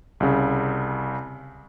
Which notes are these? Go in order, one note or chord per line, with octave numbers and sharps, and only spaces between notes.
C2 C#3